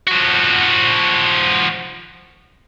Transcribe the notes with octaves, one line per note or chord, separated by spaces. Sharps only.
F3 F#4